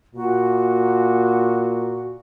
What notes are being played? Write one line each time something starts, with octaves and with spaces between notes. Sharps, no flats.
A#2 F#4